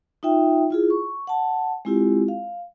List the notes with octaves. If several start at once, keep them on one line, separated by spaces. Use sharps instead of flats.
D#4 F4 E5 G5
E4 F4 G#4
C#6
F#5 A5
G#3 C4 E4 F4 G4
F5